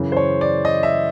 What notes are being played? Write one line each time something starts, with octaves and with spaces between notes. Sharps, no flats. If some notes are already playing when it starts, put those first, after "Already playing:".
Already playing: F#2 C#3 E3
C5
C#5
D5
D#5
E5